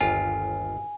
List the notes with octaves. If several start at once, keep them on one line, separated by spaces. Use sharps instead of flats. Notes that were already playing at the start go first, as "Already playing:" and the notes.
G1 D#2 F4 G#5